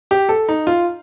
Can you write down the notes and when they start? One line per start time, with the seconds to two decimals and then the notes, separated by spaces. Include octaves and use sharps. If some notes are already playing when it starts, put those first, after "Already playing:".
0.11 G4
0.29 A4
0.49 D#4
0.67 F4